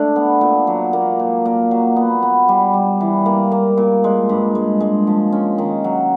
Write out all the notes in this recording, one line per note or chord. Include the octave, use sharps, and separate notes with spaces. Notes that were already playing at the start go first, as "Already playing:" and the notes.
Already playing: A3 D4
B3
A#2
F#3
A#3
A#2
A#3
F#3
B3
B3
G3
G3
E3
A#3
A#3
A#2
G#3
G2
G#3
G#3
F3
C#4
D#3
F#3